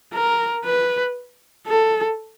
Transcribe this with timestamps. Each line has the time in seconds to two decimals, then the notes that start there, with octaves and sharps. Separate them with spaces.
0.14 A#4
0.65 B4
1.67 A4